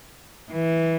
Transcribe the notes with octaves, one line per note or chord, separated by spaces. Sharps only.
E3